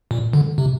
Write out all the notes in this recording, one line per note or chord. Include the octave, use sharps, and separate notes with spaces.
A#2
D3
C3